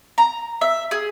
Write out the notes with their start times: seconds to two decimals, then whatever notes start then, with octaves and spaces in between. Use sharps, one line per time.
0.18 A#5
0.61 E5
0.91 G#4